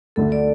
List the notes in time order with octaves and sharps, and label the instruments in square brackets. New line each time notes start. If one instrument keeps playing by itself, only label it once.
[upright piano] D2 D3 A3 D4 [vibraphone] A4
[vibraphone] D5